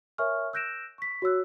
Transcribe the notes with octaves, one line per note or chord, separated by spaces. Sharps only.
A#4 C#5 E5 G#5 C#6 F6
E6 F#6 G6 A#6 D7 E7
C#6 B6
F#4 C#5 E6 F#6